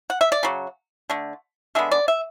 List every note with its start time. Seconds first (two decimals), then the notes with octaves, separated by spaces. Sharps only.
0.10 F#5
0.21 E5
0.32 D5
0.43 C#3 F#3
1.10 D3 A3
1.75 D3 G#3 B3 E5
1.91 D5
2.08 E5